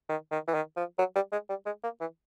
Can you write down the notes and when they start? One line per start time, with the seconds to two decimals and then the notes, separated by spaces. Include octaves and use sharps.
0.09 D#3
0.31 D#3
0.48 E3
0.54 D#3
0.77 F3
0.99 F#3
1.15 G3
1.32 G#3
1.49 G3
1.66 G#3
1.84 A#3
2.01 E3